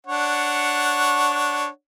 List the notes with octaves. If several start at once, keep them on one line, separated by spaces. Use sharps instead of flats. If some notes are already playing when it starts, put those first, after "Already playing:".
D4 C#5 F#5